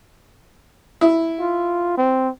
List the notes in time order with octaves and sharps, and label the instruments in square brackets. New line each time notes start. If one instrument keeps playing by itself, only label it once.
[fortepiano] E4
[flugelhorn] F4
C4